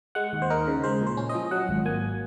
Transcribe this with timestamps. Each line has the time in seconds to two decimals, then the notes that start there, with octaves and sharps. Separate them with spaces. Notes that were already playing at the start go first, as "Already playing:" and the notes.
0.15 G#3 F#5
0.33 D#2
0.42 C5
0.50 D#4 A#4
0.67 C#3
0.83 G#3 C5
1.01 A#2
1.07 C5
1.17 C#4
1.29 D#5
1.35 F3
1.51 F#3 F#5
1.69 G#1
1.85 A#3 G#5